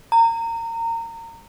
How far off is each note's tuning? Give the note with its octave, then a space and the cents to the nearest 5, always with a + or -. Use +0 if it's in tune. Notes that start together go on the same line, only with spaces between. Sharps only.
A#5 -25